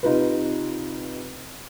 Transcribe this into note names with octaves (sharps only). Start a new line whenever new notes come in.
C3 D#4 F4 B4